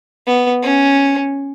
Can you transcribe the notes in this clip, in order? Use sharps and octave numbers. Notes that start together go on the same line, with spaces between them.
B3
C#4